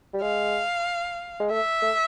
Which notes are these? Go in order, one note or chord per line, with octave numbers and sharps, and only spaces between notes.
G3
G#3 F5
G#3
A3 E5
A3